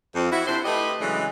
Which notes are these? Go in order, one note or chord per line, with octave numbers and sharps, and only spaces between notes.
F2
E4 F#4
C3 D4 E4 C5
A3 E4 G4 B4 D#5
C#3 E3 F#3 G#3 A3 D4